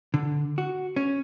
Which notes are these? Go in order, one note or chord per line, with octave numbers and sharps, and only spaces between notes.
D3
F#4
C#4